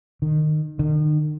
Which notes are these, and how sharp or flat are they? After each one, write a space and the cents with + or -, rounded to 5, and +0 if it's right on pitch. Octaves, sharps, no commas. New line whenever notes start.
D#3 -25
D#3 -40